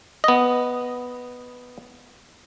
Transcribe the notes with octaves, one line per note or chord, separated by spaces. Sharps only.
B3 D#5